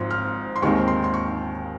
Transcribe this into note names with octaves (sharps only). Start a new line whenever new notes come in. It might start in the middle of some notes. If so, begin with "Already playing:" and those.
Already playing: G#1 G#2 F3 C4
F6
C6
D#2 D#3 G#3 C4 C#6
C6
C6
C#6